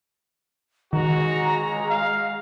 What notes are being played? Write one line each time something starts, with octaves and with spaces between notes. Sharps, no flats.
D#3 G#3 F#4 A#5
F5